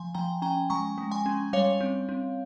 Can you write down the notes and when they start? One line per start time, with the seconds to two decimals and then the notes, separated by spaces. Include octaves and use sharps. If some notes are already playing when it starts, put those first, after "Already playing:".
Already playing: F3 G#5 C6
0.15 F3 G5 A#5
0.42 C#4 G5 A#5
0.70 G#3 A#5 C#6
0.98 G#3
1.12 G#5 C6
1.26 C#4
1.53 G3 C#5 F5
1.81 C4
2.09 C4